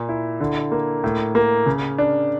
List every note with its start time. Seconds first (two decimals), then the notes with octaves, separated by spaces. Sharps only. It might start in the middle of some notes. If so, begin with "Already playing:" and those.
Already playing: A#2
0.09 E4
0.40 D3
0.72 A#3
1.04 A2
1.35 A#3
1.66 C#3
1.98 D4